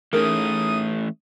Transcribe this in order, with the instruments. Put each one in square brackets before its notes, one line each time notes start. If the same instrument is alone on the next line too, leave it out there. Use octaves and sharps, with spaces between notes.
[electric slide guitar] E3 A3 C#4 [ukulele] D#4 G#4 A#4 [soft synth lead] D#6